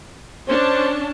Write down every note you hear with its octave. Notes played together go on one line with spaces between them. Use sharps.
C#4 D4 C5 A5